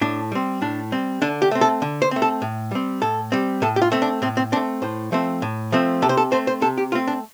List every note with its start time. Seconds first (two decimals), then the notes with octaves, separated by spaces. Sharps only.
0.01 A2 D4
0.32 G3 C4
0.62 A2 D4
0.92 G3 C4
1.22 D3 D4
1.42 G4
1.51 A3 C4
1.61 A4
1.82 D3
2.02 C5
2.11 A3 C4
2.22 A4
2.42 A2
2.72 G3 C4
3.02 A2 A4
3.32 G3 C4
3.62 A2 A4
3.76 G4
3.82 F4
3.92 A3 C4
4.02 D4
4.22 A2 C4
4.37 C4
4.52 C4 D4
4.56 A3
4.82 A2 C5
5.12 F3 A3 C4
5.42 A2
5.72 F3 A3 C4
6.02 C3 A4
6.09 C5
6.17 A4
6.32 A3 C4 C5
6.47 C5
6.62 C3 A4
6.78 G4
6.92 A3 C4 F4
7.08 D4